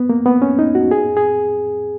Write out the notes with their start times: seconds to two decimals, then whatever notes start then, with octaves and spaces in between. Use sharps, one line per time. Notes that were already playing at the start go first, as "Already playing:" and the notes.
Already playing: B3
0.09 A#3
0.26 B3
0.42 C#4
0.59 D#4
0.75 F#4
0.91 G#4
1.17 G#4